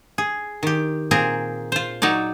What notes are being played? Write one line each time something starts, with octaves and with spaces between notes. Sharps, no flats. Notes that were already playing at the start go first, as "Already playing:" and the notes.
G#4
D#3 G4
A#2 C4 G#4 A#4
F4 C5
F#3 D#4 C#5 D5